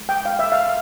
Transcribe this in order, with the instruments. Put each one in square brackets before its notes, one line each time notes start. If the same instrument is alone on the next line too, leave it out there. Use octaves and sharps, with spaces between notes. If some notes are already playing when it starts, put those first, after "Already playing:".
Already playing: [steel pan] G#3
G5
F5
E5
F5